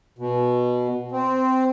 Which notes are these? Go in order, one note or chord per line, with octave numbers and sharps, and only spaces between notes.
B2
C4